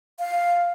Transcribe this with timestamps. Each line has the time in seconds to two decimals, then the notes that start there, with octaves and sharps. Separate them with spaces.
0.19 F5